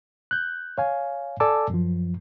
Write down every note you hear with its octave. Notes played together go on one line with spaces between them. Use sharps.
F#6 G6
C#5 F5 G#5
A4 D5 G#5 A5 D6 E6
F#2 F3